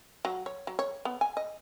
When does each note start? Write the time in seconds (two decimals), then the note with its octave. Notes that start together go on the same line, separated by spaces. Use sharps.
0.25 F#3
0.46 C#5
0.67 F#3
0.79 C#5
1.05 B3
1.21 G#5
1.37 D#5